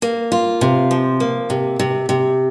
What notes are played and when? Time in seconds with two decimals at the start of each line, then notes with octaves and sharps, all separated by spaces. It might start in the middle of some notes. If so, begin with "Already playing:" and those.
0.02 A#3
0.32 F4
0.61 C3
0.91 F3
1.20 A#3
1.50 C3
1.79 C3
2.09 C3